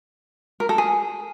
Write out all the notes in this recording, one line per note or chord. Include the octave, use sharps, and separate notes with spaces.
A#4
A4
G#4